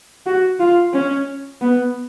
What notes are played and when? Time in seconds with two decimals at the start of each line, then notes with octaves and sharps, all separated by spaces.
0.26 F#4
0.60 F4
0.93 C#4
1.61 B3